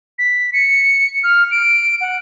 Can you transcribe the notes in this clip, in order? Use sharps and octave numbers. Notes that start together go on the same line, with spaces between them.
B6
C#7
F6
D7
F#5